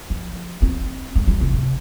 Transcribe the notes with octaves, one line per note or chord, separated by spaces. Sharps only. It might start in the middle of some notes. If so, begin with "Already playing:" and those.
F3
C4
G#3
G3
C3
C3